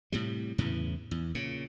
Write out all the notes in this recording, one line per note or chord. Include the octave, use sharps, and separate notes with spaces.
A2 C3 G3
E2 A2 C#3 E3
E2
A#2 C#3